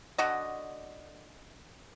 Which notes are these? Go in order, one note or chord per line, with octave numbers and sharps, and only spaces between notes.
D3 F#4 D#5